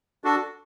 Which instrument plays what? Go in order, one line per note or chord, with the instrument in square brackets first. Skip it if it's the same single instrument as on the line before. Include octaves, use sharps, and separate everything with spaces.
[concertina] D4 F#4 A4